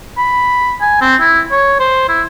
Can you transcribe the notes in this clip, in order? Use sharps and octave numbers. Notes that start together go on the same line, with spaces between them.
B5
G#5
C4
E4
C#5
C5
E4